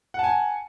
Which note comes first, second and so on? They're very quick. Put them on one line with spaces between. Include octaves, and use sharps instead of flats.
F#5 A5 G#5